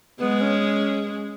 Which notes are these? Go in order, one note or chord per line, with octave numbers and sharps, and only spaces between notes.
G#3 B3
C#4